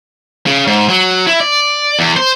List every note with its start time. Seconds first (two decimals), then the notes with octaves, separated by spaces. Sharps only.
0.46 C#3
0.67 G#2
0.89 F#3
1.27 E4
1.40 D5
1.99 E2
2.16 C5